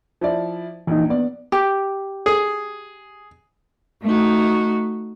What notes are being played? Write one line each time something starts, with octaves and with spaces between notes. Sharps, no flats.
F3 E4 D5
A#1 E3 D#4
B3 D5
G4
G#4
A3 D#4 F#4